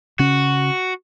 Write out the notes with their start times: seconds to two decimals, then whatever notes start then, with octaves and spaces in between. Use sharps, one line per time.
0.19 C#3 C#4 F#4